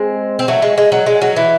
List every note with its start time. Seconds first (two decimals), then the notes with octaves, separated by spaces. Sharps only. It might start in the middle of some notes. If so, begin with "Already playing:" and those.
Already playing: G#3 C4
0.39 C4
0.48 F#3 A3
0.62 G#3
0.78 G#3
0.92 F#3
1.06 G#3
1.22 F#3
1.36 E3